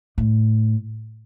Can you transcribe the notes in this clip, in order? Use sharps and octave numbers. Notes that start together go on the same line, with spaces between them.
A2